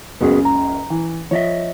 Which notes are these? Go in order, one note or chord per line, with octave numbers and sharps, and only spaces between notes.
F#1 C#2 C#3 B3 F#4 G#4
A#5
E3
F3 C#5 D#5 E5